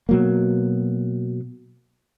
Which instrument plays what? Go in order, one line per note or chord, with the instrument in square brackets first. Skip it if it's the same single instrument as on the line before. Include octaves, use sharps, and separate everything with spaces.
[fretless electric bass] B2 F#3 A#3